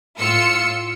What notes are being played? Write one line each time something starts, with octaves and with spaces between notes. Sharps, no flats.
A2 F4 E6 C#7